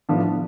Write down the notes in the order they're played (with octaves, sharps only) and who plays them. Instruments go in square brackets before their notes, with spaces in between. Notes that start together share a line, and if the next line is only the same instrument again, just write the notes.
[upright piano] A2 F3 B3 D4